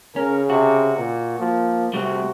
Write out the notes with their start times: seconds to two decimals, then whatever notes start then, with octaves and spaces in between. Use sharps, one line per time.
0.16 C#3 C#4 A#4
0.50 C3 F#4
0.97 A#2
1.39 F3 A#3
1.94 C3 G3 A3 C4 F#4